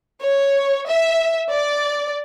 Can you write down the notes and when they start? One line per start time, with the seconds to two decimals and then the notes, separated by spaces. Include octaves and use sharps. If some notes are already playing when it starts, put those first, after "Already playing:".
0.23 C#5
0.89 E5
1.50 D5